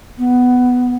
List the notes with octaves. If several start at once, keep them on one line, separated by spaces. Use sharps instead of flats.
B3